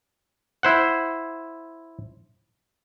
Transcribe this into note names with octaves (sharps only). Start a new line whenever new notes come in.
E4 C5 F#5